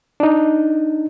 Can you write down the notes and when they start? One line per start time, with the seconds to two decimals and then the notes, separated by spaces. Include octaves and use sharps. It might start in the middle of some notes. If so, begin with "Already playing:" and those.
0.20 D4 D#4